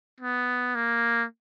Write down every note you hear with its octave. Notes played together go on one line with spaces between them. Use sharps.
B3
A#3